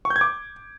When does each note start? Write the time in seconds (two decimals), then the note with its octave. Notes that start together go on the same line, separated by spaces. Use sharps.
0.05 C#6
0.10 G6
0.16 G#6
0.21 D6